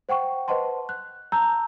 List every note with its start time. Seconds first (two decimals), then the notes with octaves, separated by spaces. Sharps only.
0.09 C5 F#5 G5 C#6
0.48 B4 C5 D#5 F#5 A5 C6
0.89 F#6
1.32 A5 A#5 E6 G6